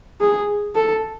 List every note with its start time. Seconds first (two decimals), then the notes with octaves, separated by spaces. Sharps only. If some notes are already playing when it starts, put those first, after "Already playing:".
0.21 G#4
0.75 A4